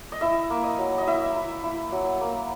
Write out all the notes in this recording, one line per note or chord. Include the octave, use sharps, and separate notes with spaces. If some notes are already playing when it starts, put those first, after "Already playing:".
D#5
E4 E5
A#3
D#5
F#3
D#5
E4 E5
E4
E4
F#3
A#3